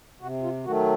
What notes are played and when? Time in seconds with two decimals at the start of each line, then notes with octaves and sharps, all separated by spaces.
0.21 C3 F#4
0.43 F4
0.65 D#3 F#3 A3 F#4